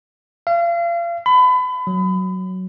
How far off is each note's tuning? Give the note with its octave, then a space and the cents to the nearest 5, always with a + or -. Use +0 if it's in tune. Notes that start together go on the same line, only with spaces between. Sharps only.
F5 -35
B5 +30
F#3 +5